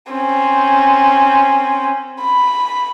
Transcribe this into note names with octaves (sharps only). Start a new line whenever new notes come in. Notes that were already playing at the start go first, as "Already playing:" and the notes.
C4 C#4
B5